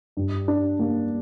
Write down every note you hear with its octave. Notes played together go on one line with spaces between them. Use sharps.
G2
D4
A#3